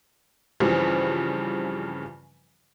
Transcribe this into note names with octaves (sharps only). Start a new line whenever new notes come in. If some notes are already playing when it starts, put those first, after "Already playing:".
G2 C#3 E3 F3 G3 C4